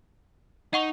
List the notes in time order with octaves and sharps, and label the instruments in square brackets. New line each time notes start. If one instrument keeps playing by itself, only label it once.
[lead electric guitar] D#4 [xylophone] D#5 F#5 C#6